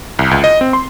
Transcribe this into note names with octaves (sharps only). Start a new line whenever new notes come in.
C2
C#2
D#5
C4
C6